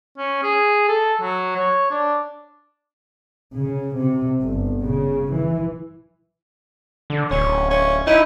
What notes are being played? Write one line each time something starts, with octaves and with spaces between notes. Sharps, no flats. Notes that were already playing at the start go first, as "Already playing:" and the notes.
C#4
G#4
A4
F#3
C#5
D4
C#3
C3
G1
C#3
E3
D3
D1 C#4
C#4
D#4 E4